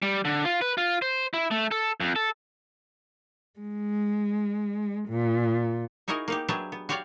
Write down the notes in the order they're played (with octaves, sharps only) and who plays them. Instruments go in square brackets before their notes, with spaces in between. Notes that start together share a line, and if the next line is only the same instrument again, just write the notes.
[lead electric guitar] G3
D3
F4
B4
F4
C5
E4
A3
A4
F2
A4
[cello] G#3
A#2
[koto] D#4 E4 F#4 G#4 A#4 D#5
A#3 D#4 G4
F#3 D4 G4 G#4 B4 E5
B3
F#4 G4 C#5 D5 F5 G5